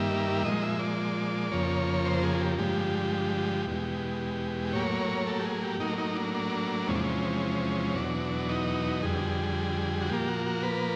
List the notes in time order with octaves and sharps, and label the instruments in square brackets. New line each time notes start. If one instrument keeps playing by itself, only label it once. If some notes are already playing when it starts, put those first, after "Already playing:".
Already playing: [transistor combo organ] G2 D#3 G3 A#3 E5
A#2 F3 G#3 D#5
E5
D5
F2 C#3 F3 A#3 C#5
C5
G#4
G4
G2 D3 F3 G#3 G4
E2 B2 G#3
A2 F#3 A#3 C#5
A4
G4
G#4
G4
A2 F#3 A#3 D#4
D#4
D4
D4
E2 C3 F3 G#3 C#4
D4
C#4
E2 B2 F#3 D4
D#4
F2 D3 G3 G#4
F#4
A#2 F3 A#3 G4
F#4
F#4
B4